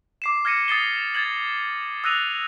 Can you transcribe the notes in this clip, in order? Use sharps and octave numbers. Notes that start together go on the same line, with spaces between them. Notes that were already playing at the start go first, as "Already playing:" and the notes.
D6 C7 E7
F6 G#6 A#6 C#7 D#7
D#6 A6 C7 G7
G#6 A6 F#7
D#6 E6 F#6 A#6 D#7 F7